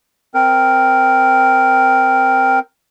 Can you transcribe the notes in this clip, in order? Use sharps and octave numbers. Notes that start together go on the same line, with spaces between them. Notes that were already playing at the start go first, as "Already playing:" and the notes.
C4 A#4